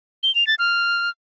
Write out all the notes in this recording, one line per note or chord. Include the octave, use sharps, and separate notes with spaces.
G7
F7
A6
F6